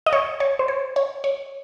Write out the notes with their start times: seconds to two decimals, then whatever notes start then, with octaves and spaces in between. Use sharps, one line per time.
0.06 D#5
0.13 C#5
0.40 C#5
0.59 C5
0.68 C#5
0.96 C#5
1.24 C#5